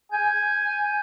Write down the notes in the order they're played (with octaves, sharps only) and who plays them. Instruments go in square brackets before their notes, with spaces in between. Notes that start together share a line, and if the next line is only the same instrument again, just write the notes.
[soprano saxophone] G#5 [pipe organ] G6